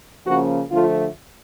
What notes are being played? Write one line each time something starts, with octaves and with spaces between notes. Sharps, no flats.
C#3 F3 A#3 C#4 F#4
D3 F3 A3 F4